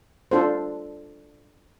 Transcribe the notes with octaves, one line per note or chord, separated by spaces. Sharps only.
D4 F4 A4 C5